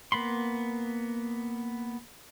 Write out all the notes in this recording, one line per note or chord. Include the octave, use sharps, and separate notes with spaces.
A#3 B3 B5 C6